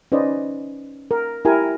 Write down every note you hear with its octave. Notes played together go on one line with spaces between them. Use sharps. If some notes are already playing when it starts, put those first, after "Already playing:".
C#4 D#4 B4 C5 D5 D#5
A#4
E4 G4 A#4 G#5